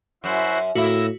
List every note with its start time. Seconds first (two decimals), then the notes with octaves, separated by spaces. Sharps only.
0.24 F#2 E4 F#4 C5
0.75 A2 A#3 E4 F#4 E6 A#6